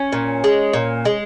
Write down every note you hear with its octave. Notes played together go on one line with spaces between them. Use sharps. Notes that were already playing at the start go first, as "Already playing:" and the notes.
Already playing: C#4
A#2
G#3
A#2
G#3